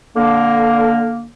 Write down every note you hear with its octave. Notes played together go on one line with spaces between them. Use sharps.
D3 A#3